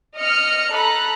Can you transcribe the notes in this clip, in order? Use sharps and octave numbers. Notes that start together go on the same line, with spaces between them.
D#5 F6 C#7
A4 A#5 B5 F#6